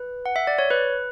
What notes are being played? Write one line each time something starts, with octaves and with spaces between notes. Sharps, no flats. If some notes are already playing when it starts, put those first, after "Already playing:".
Already playing: B4
F#5
E5
D5
C#5
B4